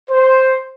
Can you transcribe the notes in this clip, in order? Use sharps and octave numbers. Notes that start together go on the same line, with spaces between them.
C5